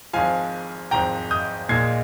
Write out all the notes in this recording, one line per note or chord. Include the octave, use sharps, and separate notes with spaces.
G#1 G#2 F3 F5 G#5
G#1 G#2 F3 G5 A#5
D#6 G6
A#1 A#2 G#3 D#4 G#6 C7